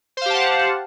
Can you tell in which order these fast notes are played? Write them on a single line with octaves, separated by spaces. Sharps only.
C5 F5 G4 A5 F#5